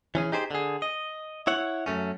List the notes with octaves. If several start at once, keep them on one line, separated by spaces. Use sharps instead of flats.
E3 C#4 G#4
D#4 G4 G#4 C5
D3 G#4
D#5
E4 C#5 F#5
F#2 A3 C#4